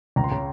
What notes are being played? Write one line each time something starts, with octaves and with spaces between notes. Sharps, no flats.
C#2 A#5
C6
C#3 A#5